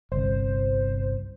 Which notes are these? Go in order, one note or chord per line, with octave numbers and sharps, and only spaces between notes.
G1 C2 C5